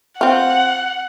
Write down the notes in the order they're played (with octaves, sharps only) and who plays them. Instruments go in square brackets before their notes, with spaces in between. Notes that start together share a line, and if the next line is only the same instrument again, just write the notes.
[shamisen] C4 F4 [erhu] F#5